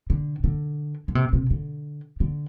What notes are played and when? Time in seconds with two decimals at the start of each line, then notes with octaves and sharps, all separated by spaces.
0.10 D3
0.44 D3
1.08 D3
1.15 C3
1.33 C3
1.50 D3
2.20 D3